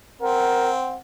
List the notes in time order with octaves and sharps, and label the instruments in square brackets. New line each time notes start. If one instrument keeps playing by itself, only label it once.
[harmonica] C4 [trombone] A#4 [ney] F#5